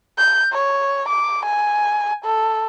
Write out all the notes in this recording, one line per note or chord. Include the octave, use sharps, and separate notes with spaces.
G6
C#5
D6
G#5
A4